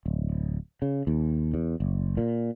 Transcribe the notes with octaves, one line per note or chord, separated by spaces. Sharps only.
D1
C#3
D#2
E2
F#1
A#2